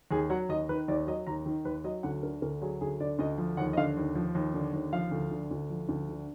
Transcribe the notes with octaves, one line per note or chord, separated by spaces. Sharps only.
D#2 G#4
F#3 F#5
D#2 D#5
D#3 B4
D#2 D5
F#3 D#5
D#2 A#5
D#3
D#2 B4
F#3 D#5
D2 F#5
D3 A#4
D2 A#4
F#3 G#4
D2 G#4
D3 D5
D2 D#5
F3
D#2 F#5
D#5
D3 F5
D#2
F3
D#2
D3
D#2
F3 F5
D2
D3
D2
F3
D2
D3